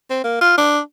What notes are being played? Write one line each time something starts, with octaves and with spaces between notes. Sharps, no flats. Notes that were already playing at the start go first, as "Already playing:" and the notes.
C4
A#3
F4
D4